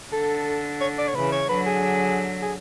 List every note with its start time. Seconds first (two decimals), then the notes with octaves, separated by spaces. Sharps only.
0.12 D3 A4
0.81 C#5
0.98 D5
1.07 C#5
1.15 C#3 E3 B4
1.32 C#5
1.49 D3 F#3 B4
1.66 G#4
2.42 G#4